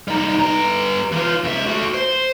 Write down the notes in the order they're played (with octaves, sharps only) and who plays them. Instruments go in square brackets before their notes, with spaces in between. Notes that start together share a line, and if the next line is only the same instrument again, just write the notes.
[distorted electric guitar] G3 D#4
G2 A#5
E3 F4
C#2 E5
A3 F#4
C5